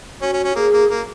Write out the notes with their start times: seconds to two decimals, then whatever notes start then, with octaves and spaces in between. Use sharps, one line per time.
0.22 C#4 F#4
0.33 C#4
0.44 C#4
0.55 A#3 G#4
0.73 A#3
0.90 A#3